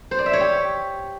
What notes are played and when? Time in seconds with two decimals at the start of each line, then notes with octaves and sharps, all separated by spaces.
0.11 C5
0.19 D5
0.26 E5
0.33 C#5
0.41 G4